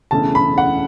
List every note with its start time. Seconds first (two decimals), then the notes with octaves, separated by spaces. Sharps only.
0.11 E1 E2 C#3 E3 A3 A5
0.35 B5
0.58 F#5